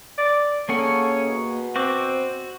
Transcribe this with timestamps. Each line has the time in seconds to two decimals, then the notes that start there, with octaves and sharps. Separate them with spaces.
0.18 D5
0.69 A#3 C#4 G#4 A4 F#5
1.27 B2
1.76 C4 F#4 C5 D6